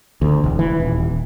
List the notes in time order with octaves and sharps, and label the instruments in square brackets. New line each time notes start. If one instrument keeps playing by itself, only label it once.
[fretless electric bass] D2
E1
E3
D#1